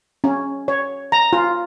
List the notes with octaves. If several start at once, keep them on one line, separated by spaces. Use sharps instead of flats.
C#4
C#5
A#5
F4